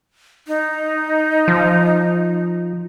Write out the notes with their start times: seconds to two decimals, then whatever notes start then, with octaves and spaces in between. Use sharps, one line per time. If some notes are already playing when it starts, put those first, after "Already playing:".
0.47 D#4
1.48 F3